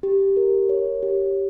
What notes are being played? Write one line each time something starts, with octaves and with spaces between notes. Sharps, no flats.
G4
A#4
C#5
G4